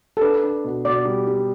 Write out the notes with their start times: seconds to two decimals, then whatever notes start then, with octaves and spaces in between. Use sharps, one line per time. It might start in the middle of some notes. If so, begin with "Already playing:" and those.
0.17 A4
0.21 D4 B4
0.43 D4
0.64 B2
0.85 B2 D5
1.05 G3
1.28 G3